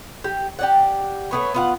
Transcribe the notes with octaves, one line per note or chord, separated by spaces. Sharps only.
G4
G4 D5 F#5
A3 B3 C#5
B3 F4 F#5